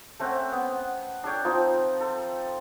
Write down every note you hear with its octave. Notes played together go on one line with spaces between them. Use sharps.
A3 C4 C#4 F#5
B3
D4 A4 C#5 G5
F3 C4 D#4 F4
A4 C6